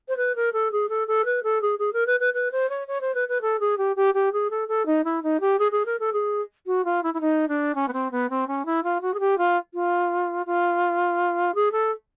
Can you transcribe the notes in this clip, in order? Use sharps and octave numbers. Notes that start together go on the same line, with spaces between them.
C5
B4
A#4
A4
G#4
A4
A4
B4
A4
G#4
G#4
A#4
B4
B4
B4
C5
C#5
C#5
C5
B4
B4
A4
G#4
G4
G4
G4
G#4
A4
A4
D#4
E4
D#4
G4
G#4
G#4
A#4
A4
G#4
F#4
F4
E4
E4
D#4
D4
C#4
B3
C4
B3
C4
C#4
E4
F4
F#4
G#4
G4
F4
F4
F4
G#4
A4